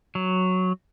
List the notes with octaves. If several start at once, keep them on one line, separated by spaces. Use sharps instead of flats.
F#3